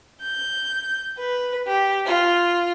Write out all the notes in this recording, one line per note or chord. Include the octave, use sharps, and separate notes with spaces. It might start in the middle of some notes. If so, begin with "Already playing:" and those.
G6
B4
G4
F4